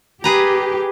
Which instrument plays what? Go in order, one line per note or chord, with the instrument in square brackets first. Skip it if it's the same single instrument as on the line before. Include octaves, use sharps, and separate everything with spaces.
[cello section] G4 [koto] G#4 B4 A#5